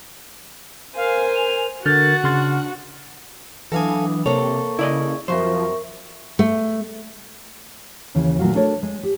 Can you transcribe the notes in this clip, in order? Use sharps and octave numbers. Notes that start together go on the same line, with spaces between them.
A#4 C5 F5 G#5
F7
D3 F#4 A#4 F#5 F6 G6 A6
C#3 D4 C6 F6 A6
E3 F#3 D4 A4 F5 G#5 D#6
C3 A#3 A4 C#5 C#6
C#3 E4 D5 D#5
F2 A#2 F3 F#3 A#4 C5 E5 C#6
A3
D#2 C#3 E3
A#2 D#3 F#3 A3 F4 F#4
A3 D4 F#4 A4 A#4 C#5
G#3
G4